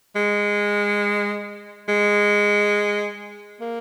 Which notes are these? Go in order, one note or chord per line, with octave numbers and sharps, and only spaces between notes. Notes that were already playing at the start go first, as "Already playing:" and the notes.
G#3
G#3
A#3